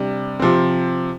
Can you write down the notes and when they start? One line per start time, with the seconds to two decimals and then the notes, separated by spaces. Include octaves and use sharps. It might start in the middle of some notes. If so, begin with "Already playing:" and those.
Already playing: C3 G3 D4
0.40 C3 F3 C4